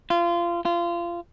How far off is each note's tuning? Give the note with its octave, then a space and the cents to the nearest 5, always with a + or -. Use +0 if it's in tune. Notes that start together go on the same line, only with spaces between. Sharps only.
F4 -25
F4 -25